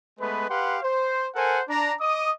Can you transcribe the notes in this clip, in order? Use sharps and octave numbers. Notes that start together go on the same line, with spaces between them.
G#3 A3 B3 B4
G4 B4 F5 F#5 C6
C5
A4 A#4 C5 F#5 G#5
D4 A#5
D#5 D6 D#6